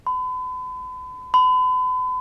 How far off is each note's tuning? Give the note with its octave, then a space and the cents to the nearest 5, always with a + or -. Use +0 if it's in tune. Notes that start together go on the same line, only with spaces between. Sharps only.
B5 +40
B5 +40